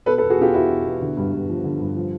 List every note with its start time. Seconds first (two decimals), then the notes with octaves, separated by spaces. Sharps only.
0.06 B2 A4 B4
0.18 A4 B4
0.22 E2
0.30 F#4 G#4
0.38 B2 F4 G4
0.54 E2 E4 F#4
0.69 B2
0.85 E2
1.01 D3
1.17 G2
1.33 G2
1.49 F3
1.64 D3
1.81 G2
1.96 F3